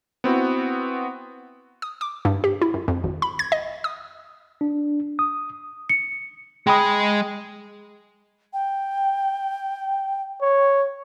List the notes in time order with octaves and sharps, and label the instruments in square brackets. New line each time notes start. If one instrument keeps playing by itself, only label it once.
[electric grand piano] B3 C4 E4 F#4
[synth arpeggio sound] D#6
D6
G2
G4
E4
F#2
F2
G#1
B5
G#6
D#5
D#6
[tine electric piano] D4
D#6
[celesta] C#7
[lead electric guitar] G#3 G#4 [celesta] G5 B5 D#6
[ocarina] G5
[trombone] C#5